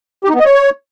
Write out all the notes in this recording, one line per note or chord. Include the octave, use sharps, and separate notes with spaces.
G4
D#4
B3
D#5
C#5